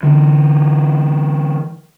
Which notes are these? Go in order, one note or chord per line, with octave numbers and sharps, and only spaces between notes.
D3 E3